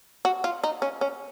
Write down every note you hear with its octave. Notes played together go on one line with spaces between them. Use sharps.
F#4
F4
D#4
C#4
C#4